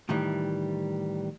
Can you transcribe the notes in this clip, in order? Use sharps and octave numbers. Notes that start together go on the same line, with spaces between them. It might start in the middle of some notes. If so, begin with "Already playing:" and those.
A2 D#3 E3 G3